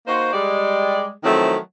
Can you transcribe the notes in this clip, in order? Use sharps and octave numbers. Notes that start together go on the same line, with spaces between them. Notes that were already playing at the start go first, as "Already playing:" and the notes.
A#3 D#4 F#4 C5
G3 G#3 D5
D#3 F3 F#3 A3 C4 E4